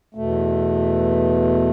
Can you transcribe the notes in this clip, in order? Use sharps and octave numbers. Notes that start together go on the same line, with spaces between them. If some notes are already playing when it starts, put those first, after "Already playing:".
E2 B2 A3